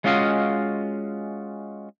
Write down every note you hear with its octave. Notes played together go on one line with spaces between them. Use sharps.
G#3 C#4 F4 F#4 D#5 F5